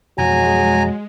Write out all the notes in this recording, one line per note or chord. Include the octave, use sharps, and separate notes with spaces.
F2 B2 E3 F#3 G#3 G#5 A#5